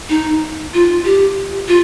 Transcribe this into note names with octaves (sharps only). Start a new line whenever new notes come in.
D#4
F4
G4
F4